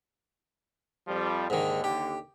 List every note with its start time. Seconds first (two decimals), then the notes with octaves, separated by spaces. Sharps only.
1.08 F2 F3 G3
1.50 D#2 G#2 D3 D#3
1.84 G4